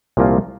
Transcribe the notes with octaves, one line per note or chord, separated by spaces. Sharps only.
C2 A#2 F3 A#3 F4